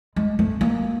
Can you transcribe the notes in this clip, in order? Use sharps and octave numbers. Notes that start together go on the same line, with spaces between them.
G#3
A3
A#3